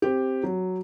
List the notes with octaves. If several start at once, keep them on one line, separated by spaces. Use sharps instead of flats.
C4 G4
F#3